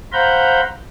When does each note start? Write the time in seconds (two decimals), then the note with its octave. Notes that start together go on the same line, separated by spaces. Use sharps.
0.12 C5 F5 F#5 A#5 B5 G6